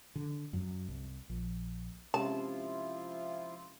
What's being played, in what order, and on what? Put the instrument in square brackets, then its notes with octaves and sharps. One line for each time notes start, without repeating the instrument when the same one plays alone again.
[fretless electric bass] D3
F#2
C2
A#1
[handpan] C3 G#3 C#4 [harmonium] F3 E4 F4 [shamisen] A5